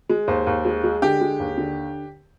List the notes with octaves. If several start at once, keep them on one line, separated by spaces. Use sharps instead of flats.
G#3
D#2 C5
D#2
G#3
G#3
D3 G4
G#3
D#2
D3